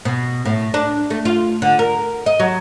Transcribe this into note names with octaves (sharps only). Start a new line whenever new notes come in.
B2
A2
D4
A3
F4
D3
A#4
D#5
F#3